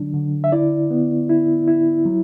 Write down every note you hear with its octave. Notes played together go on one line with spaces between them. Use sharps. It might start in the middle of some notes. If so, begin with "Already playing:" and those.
Already playing: D3 F#3 D4
D3
E5
E4 D5
B3
E4
E4
F#3